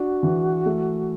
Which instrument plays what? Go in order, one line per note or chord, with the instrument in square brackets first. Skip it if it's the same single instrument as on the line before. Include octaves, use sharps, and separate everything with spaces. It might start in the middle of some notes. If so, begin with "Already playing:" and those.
Already playing: [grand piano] D4 [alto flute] F#4
[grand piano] E3
A3